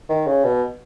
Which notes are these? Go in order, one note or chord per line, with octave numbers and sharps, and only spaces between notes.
D#3
C#3
B2